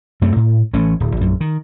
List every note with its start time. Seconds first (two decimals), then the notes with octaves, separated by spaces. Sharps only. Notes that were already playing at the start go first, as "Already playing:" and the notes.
0.21 F#2 A3 C4
0.36 A2
0.74 A1 E3 A3 C#4
1.00 D1
1.17 A#1 F#2
1.41 D#3